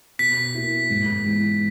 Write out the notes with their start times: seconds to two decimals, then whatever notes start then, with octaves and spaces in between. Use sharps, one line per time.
0.19 B2 B6
0.54 A#3 E4
0.90 G#2
1.26 E3 G#3 B3